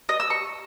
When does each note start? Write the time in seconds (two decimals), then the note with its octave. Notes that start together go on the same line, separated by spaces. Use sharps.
0.09 D#5
0.20 E6
0.30 C#6